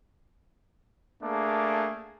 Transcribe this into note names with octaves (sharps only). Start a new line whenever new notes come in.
A3 A#3 D4 G#4